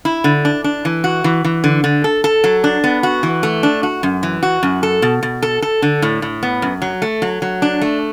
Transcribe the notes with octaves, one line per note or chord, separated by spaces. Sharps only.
E4
D3
D4
D4
E3
F#4
E3
E3
D3
D3
A4
A4
F#3
D4
B3
F#4
E3
A3
D4
F#4
F#2
E3
F#4
F#2
A4
B2
B2
A4
A4
D3
A2
A2
B3
F#2
F#3
A3
F#3
F#3
D4
A3